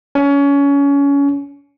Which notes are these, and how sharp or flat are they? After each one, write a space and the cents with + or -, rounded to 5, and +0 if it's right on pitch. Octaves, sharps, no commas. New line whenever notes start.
C#4 +25